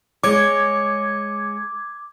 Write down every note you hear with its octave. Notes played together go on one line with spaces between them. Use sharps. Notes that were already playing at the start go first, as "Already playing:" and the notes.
G#3 C#5 D6 G#6